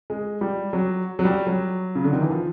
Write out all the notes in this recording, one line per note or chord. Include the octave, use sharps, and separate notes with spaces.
G#3
G3
F#3
F#3
G3
F#3
C#3
D3
D#3
E3
F3